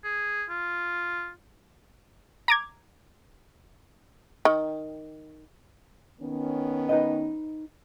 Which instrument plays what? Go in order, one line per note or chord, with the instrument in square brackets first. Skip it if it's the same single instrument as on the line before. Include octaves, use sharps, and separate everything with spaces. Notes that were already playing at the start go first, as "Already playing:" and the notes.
[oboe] G#4
F4
[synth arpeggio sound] A#5 D6 G#6
[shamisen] D#3
[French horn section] D#3 B3 C#4
[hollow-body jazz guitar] D#4 B4 D#5